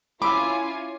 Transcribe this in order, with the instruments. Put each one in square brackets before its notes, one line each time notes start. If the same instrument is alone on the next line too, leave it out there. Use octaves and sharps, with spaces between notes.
[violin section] C#4 F4 G#5 [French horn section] E4 [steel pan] B5 E6 [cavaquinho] D6